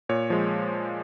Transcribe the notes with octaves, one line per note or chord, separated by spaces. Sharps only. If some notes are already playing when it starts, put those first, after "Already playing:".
A#2 C#5
F3 G#3